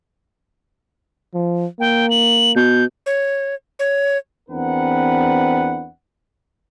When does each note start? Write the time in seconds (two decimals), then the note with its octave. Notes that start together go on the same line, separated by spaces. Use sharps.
1.35 F3
1.80 A#3 G5
2.10 F#7
2.56 B2 G6
3.06 C#5
3.79 C#5
4.49 E2 C4 D4 A#4 B4 F#5